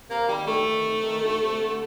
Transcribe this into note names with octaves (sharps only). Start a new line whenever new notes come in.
C3 A#3
D#3 G3
D2 A3
D#3
C3
D#3
D2
C3
D3